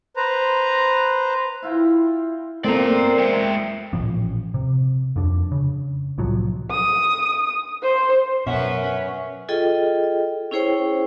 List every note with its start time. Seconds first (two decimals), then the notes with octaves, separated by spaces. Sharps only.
0.16 B4 C5 A#5
1.62 E4 F4 F5 G5
2.65 A3 A#3 C4 A#4 D5 A#5
3.19 G#3 E5 G5
3.93 A1 A#2 F3 C#4
4.54 C3
5.16 F2 D4
5.52 C#3
6.18 C2 A2 F3 F#3
6.71 D#6
7.83 C5
8.47 F#2 B2 C#4 B4 E5 F#5
9.49 F4 G#4 A4 D#5 G5
10.51 C#4 E4 G#4 C5 C#5 G5